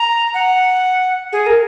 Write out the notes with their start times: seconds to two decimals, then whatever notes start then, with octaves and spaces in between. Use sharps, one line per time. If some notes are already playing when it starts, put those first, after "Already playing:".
Already playing: A#5
0.34 F#5
1.33 G#4
1.47 A#4